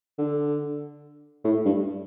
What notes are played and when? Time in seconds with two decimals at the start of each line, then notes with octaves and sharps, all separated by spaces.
0.18 D3
1.44 A2
1.65 G2